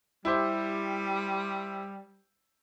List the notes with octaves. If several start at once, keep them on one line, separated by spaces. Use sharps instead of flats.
G3 E4 G4 C5